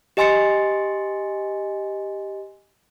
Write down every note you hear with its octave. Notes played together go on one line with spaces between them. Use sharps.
G4 D#5 G#5 C6 A6 C#7